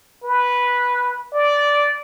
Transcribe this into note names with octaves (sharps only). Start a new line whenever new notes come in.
B4
D5